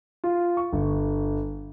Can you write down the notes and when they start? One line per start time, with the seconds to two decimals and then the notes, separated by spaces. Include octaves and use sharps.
0.24 F4
0.57 C#6
0.73 G1